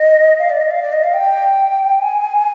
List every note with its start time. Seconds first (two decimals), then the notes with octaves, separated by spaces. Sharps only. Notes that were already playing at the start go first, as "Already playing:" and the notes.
Already playing: D#5
0.39 F5
0.50 D5
0.61 D#5
0.71 F5
0.82 D5
0.93 D#5
1.03 F5
1.14 G5
1.99 G#5